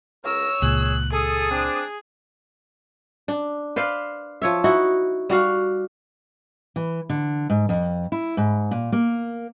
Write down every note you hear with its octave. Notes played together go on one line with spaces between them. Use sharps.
C#2 A#4 C#5 E6
C#2 A#2 G#4 F#6
G#4 A4 D#6
C4 D4
D4
B4 C5 D5 F5
F3 C#5 E5
D#4 E4 F#4
G3 F#4 F5
E3
D3
G#2
F2
E4
G#2
A#2
A#3